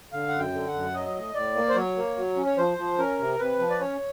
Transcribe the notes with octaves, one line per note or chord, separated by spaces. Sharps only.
D3 F5
F#2 F#5
G5
D3
F#5
F#2
F#3 D#5
A2
A2 D5
A#3
C5
F#3 C#5
A#3
F#3
C#4
C#5
F3 C5
F3
C#4 A#4
C3
C3 B4
F3
D5
C#4 C#5